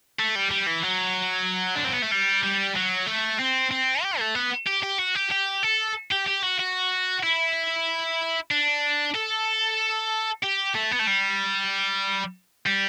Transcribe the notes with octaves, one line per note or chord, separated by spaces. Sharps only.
A3
G3
G3
E3
F#3
D4
C4
B3
A3
G3
G3
F#3
A3
C4
C4
G4
A3
B3
G4
G4
F#4
G4
G4
A4
G4
G4
F#4
F#4
E4
D4
A4
G4
A3
B3
A3
G3
G3